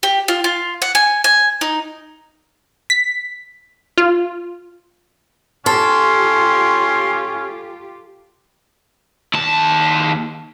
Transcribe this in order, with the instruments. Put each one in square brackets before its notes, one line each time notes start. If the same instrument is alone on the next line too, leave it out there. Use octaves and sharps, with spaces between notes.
[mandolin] G4
F4
F4
F#5
G#5
G#5
D#4
[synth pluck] B6
F4
[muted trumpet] C#4 [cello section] F4 G4 [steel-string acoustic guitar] A4 [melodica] C6
[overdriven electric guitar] D#2 A5